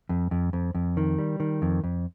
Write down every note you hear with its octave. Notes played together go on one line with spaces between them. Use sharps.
F2
F2
F2
F2
D#3
G3
D#3
F2
F2